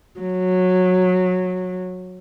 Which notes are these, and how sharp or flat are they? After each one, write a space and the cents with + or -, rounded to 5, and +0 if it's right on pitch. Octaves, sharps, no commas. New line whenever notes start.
F#3 -15